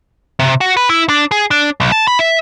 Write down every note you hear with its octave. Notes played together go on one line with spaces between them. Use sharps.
C3
F#4
B4
E4
D4
G#4
D4
B1
A5
B5
E5